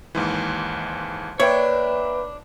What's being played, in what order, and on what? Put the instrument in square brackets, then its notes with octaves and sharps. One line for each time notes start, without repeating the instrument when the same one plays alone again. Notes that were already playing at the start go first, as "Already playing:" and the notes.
[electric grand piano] D#2 G#2 E3
[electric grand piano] A#3 E5 G5 [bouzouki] D4 [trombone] B4 [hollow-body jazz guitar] C#5